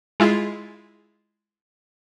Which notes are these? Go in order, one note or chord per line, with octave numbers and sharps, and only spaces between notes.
G#3 E4 F4 G#4